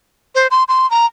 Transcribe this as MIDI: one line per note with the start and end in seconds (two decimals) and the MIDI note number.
0.35 0.47 72
0.51 0.64 84
0.68 0.89 84
0.91 1.06 82